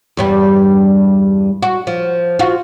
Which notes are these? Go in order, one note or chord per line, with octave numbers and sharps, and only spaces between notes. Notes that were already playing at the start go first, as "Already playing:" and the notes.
E2 G2 G3
F#4
F3
F4 F#4